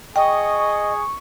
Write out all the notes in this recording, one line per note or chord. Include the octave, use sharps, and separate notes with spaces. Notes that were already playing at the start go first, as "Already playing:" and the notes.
G#4 D#5 G5 C#6